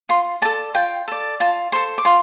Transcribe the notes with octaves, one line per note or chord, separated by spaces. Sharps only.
F4 C6
A4 D5 A5
F4 G5
A4 D5
F4 A5
A4 C5 C6
D6
F4 C6